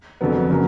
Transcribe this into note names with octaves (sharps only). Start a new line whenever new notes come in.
F1 F2 D3 F#3 B3
C#3 F#3 A#3